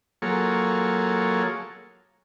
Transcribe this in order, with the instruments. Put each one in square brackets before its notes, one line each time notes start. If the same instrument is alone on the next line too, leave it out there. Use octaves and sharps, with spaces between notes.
[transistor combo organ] F#3 A#3 F4 G#4 A4 C#5